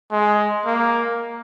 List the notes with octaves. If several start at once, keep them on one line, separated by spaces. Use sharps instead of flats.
G#3
A#3